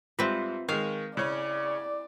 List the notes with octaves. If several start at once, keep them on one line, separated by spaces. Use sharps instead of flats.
G#2 G3 C4 F4 B4 E5
D#3 G#3 A#4 F5 C#6
C#3 C#4 E4 D5